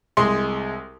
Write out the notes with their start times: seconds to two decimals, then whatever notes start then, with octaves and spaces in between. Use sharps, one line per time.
0.17 C2 G#3 C6